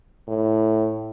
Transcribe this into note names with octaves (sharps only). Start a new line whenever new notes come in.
A2